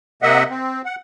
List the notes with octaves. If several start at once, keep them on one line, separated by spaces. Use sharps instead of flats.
C3 A#3 D#5 E5 F#5
C4
F#5